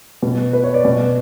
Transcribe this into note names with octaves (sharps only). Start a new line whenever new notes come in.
B2
B4
C#5
D5
B2